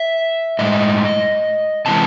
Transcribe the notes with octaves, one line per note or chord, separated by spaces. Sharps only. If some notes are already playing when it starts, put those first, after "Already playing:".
Already playing: E5
A2 E3 G#3 D#5
C3 E3 G#3 A5